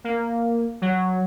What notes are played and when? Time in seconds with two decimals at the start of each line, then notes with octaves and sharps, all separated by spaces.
0.04 A#3
0.82 F#3